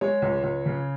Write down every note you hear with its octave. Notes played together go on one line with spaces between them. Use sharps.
G#3 C#5
C#2
C#2
C#3